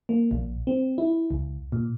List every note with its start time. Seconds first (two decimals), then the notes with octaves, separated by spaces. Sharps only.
0.09 A#3
0.31 A#1
0.67 C4
0.98 E4
1.31 C#2
1.72 A#2